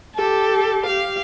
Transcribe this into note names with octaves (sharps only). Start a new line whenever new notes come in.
G4 A4
G4 F5